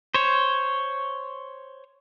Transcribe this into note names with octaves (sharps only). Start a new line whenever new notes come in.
C5 C#5